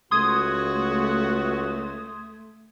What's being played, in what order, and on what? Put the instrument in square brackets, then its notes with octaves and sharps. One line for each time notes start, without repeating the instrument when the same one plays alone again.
[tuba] C#2 [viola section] A3 [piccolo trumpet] F#4 [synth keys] C6 D#6 G#6